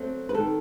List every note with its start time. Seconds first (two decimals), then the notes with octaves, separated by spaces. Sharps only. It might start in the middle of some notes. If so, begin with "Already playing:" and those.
Already playing: F#3 A3 C4
0.29 B4
0.35 D#3 A4